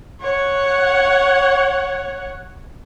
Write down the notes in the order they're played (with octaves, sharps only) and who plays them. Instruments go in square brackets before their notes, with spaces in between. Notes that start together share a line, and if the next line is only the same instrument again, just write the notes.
[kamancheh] C#5 F#5